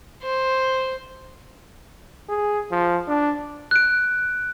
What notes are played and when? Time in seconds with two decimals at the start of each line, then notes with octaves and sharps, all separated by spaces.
0.23 C5
2.29 G#4
2.72 F3
3.08 D4
3.71 F#6 D7